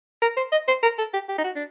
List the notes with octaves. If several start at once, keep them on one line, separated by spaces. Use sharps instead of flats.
A#4
C5
D#5
C5
A#4
A4
G4
G4
D#4
F#4
D4